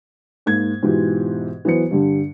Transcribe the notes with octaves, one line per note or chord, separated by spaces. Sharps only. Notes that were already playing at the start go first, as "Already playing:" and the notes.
G#2 A#3 G#6
G#2 B2 E3 F4 G4
E3 F#3 B3 C5 C#7
G2 D3 G3